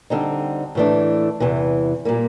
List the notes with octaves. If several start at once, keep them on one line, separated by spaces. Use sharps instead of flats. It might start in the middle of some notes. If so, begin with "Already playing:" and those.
D3 G3 C4 D#4
A2 E3 A3 D4
E2 C3 E3
A#2 G3 A#3